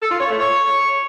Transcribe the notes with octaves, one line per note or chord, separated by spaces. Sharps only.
A4
F4
C#5
A3
C#5